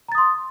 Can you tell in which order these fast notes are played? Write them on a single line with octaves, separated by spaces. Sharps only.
A#5 A6 D#6 C6